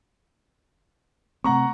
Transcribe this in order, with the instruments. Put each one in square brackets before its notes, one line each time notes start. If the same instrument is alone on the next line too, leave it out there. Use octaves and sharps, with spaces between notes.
[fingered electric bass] C3 A3 C4 [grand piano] F#5 A#5 C#6